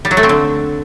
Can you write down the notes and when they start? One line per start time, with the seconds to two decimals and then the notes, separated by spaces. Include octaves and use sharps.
0.05 G3
0.11 F#3
0.17 A3
0.23 C4
0.29 D3